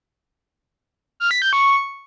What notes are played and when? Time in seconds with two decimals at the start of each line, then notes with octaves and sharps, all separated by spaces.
1.20 F6
1.31 B6
1.42 G6
1.53 C#6